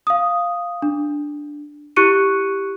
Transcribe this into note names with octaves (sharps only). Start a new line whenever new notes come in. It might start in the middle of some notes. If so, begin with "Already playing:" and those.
F5 D#6
D4
E4 G4 C#6 F#6 C#7 D#7